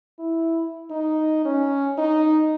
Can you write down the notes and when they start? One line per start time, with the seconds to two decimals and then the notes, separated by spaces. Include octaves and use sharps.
0.19 E4
0.91 D#4
1.45 C#4
1.98 D#4